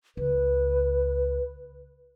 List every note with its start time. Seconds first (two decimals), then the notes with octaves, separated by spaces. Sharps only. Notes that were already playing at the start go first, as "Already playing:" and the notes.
0.17 C#2 B4